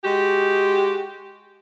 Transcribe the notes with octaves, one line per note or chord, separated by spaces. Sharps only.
G#3 F#4 G4